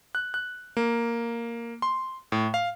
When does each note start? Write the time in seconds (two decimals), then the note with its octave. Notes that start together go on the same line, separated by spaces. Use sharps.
0.15 F#6
0.34 F#6
0.77 A#3
1.82 C6
2.32 A2
2.54 F5